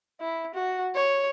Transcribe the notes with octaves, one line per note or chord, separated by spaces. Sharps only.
E4
F#4
C#5